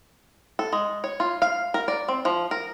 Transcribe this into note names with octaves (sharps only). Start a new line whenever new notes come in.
A4
G#3
C#5
F4
F5
A#4
D5
C4
F3
A#4